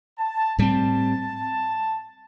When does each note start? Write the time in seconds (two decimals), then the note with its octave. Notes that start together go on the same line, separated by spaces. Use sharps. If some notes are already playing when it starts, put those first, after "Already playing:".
0.18 A5
0.58 A2 G3 C4 A5